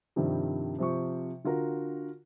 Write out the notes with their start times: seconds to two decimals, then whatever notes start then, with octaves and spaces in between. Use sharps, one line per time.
0.16 G2 C3 D#3 F3 G3
0.79 C3 F3 C#6
1.45 D3 F4 F#4 A#4